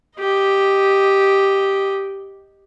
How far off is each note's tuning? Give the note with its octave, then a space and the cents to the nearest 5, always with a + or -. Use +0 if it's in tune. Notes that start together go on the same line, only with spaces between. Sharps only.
G4 +0 D#5 +0